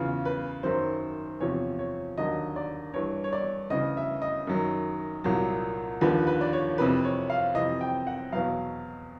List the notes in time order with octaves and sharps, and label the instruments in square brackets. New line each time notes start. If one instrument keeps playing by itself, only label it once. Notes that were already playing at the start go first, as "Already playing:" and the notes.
Already playing: [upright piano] E2 C#3 E3 F4
B4
F#2 D#3 F#3 C5
E2 C3 F3 C#5
C#5
D#2 D3 F#3 D#5
D5
G2 E3 C#5
C#5
D5
D2 C#3 E3 D#5
E5
D#5
F#2 D#3 F#3
C2 A#2 F#3
D#2 D3 F3 B4
B4
D5
C#5
F2 C3 E3 B4
C#5
F5
F2 C3 E3 D#5
G5
F#5
E2 B2 F#3 F5